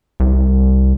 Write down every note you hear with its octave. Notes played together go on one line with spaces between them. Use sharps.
C2